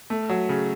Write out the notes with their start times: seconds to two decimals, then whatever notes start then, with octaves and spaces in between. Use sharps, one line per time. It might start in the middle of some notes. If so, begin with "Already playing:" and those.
0.10 A3
0.29 F#3
0.49 C#3